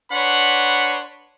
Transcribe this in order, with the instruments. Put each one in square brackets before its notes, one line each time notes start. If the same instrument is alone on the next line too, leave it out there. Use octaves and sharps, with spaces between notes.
[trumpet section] D4 B4 C#5 F#5 B5 C6